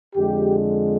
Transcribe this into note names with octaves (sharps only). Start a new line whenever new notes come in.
F2 D3 G#3 G4